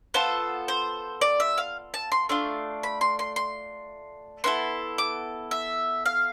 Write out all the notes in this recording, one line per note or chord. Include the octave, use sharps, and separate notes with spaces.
B3 F4 A4 C5
C5
D5
E5
F5
A5
C6
A3 D4 F4 C6
B5
C6
C6
C6
B3 E4 A4 C6
D6
E5
F5